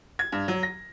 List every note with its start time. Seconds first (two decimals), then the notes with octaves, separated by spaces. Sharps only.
0.19 G#6
0.32 G2
0.48 F#3
0.63 A#6